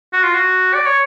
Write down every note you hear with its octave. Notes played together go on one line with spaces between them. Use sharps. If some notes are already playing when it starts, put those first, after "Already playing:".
F#4
F4
F#4
D5
C#5